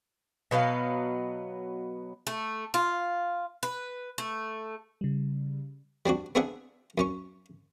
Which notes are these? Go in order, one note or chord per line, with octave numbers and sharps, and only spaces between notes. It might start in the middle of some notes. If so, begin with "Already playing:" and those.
B2 F#3 B3 F5
A3
F4
B4
A3
C#3 G3
G3 C4 D4 F#4
B3 C4 D4 G#4 E5 F#5
F#2 C#4 C#6